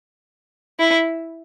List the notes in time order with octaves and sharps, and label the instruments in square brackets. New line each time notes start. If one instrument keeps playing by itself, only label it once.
[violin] E4